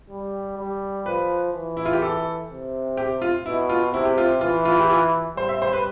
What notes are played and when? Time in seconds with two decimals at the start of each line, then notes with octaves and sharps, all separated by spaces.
0.10 G3
0.58 G3
1.06 F3 B4
1.53 E3
1.77 E4
1.85 F4
1.93 G4
2.02 A4
2.50 C3
2.97 G4
3.22 F4
3.46 B2 E4
3.69 F4
3.93 C3 E4
4.05 G4
4.18 F4
4.41 E3 F4
4.65 F4
4.79 G4
4.90 F4
5.37 G3 C5
5.49 E5
5.62 C5
5.73 B4